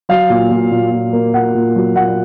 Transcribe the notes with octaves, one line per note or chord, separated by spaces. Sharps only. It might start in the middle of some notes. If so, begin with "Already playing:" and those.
F#3 F5
A#2
A#2
A#2
A#2
A#3
A#2 F#5
A#2
F#3
A#2 F#5